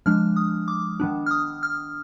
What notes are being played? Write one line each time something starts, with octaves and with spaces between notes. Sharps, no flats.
F3 G#3 D4 F6
D#6
D6
D#3 B3 D4
F6
D#6
F6